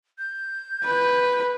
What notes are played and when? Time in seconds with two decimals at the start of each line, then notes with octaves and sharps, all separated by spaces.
0.18 G6
0.85 B4